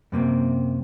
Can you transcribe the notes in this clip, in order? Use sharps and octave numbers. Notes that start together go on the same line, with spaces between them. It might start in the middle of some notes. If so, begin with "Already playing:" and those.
F#2 C3 A#3 C4